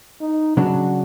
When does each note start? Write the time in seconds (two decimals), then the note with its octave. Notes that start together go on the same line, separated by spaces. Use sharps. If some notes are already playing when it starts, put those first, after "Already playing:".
0.21 D#4
0.57 C#3 F#3 D4 F#4